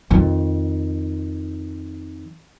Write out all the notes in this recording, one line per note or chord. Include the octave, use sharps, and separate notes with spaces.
F2 D#3